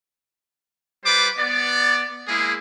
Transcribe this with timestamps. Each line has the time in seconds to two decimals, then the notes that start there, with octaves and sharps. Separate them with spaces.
1.05 G3 F4 B4 C5 D6
1.38 B3 D5
2.28 G#3 A#3 E4 G#4